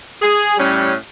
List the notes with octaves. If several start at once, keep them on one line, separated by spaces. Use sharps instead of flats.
G#4
A2 G3 C#4